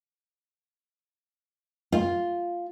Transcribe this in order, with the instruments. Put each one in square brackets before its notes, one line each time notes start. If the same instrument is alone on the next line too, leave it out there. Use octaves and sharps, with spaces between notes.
[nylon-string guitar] F4